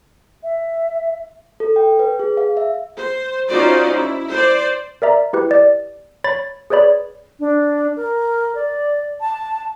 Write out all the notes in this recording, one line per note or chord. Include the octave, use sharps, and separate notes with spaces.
E5
A4
G5
B4
G#4
F5
E5
C5
C#4 D#4 F4 F#4 C5 D5
E4
C5 D5
A#4 D5 E5 A#5
E4 G4 B4
D5
C#5 B5 A6
G#4 B4 C#5 D5 B5
D4
A#4
D5
A5